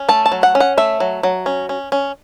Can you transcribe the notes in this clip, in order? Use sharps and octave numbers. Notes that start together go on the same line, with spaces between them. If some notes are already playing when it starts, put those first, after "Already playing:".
Already playing: C#4
A3 A5
A5
F#3
F#5
C#4
F#5
A3 E5
F#3
F#3
C#4
C#4
C#4